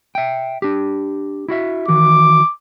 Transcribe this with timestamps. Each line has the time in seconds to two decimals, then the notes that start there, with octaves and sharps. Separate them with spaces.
0.15 E5 G5
0.62 D4 G4
1.48 E4 F#4 E5
1.88 D#3 E3 F#4 D6